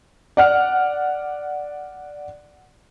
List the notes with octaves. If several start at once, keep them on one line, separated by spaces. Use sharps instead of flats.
D5 F#5 F6